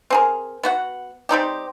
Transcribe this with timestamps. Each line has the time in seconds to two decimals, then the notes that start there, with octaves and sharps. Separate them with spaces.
0.10 C4 G#4 A#4
0.63 B3 F#4 F#5
1.29 G3 C4 D#4 G4